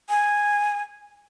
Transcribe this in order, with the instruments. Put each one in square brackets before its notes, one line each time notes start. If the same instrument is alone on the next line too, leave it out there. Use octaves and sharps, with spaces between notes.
[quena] G#5